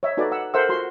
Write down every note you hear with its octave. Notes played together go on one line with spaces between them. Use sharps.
C#5 D#5 E5
D#4 F#4 A4 B4 D5
F#5 E6
A4 A#4 C5 E5 F#5 E6
F4 F#4 C6